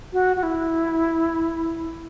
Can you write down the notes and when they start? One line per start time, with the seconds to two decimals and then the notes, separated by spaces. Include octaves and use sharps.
0.13 F#4
0.37 F#4
0.43 E4